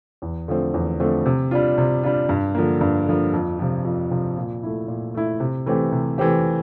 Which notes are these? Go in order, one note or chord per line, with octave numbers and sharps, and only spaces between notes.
E2
D3 F3 A3 C4
E2
D3 F3 A3 C4
C3
G3 D4 F4
C3
G3 D4 F4
G2
D3 F3 A#3
G2
D3 F3 A#3
F2
C3 F3
F2
C3 F3
A#2
A3 E4
A#2
A3 E4
C3
E3 A3 C4 G4
C3
E3 A3 C4 G4